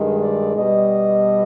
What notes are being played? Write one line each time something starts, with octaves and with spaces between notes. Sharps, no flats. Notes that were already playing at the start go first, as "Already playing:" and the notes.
Already playing: G2 D#3 G#3
D5
B2 G3 D#5